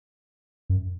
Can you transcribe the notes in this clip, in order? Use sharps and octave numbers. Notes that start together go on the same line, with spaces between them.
F#2